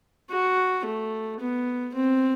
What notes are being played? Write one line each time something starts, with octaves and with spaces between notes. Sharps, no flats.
F#4
A3
B3
C4